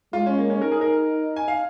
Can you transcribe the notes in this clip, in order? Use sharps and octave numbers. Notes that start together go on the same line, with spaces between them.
G#3 F4
C#4
A#3
C#4
D#4 A#4
G#4
A#4
G#5
F5